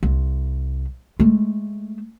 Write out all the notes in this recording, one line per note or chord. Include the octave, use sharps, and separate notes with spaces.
C2
G#3 A3